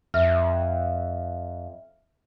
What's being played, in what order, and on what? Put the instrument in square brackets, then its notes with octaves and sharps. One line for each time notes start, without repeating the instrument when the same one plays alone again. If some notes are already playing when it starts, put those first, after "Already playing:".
[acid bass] F2 [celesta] E5 F6